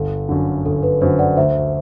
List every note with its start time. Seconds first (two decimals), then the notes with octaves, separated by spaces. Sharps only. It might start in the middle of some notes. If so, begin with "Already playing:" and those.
Already playing: G1 A4
0.29 F#2 D3
0.66 G1 A4
0.83 B4
1.01 F#2 D3 C5
1.19 D5 F#5
1.37 D2 C5 E5